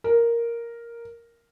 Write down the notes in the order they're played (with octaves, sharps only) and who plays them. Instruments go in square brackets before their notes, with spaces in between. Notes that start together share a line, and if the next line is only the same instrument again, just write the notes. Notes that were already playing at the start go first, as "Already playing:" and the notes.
[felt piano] A#4